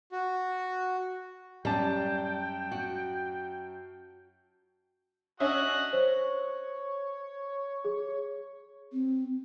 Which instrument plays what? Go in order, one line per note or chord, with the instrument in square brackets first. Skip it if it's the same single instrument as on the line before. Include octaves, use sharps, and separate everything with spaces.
[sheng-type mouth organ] F#4
[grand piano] F#2 A5 [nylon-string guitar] G3 [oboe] G5
[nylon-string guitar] F#4
[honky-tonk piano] C#4 D4 E5 [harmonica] F#4 D#5 F#5
[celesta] C5 [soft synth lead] C#5
[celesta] G#4
[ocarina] C4